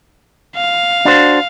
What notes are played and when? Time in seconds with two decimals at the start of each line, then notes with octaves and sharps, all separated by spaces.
0.56 F5
1.05 D4 F#4 C5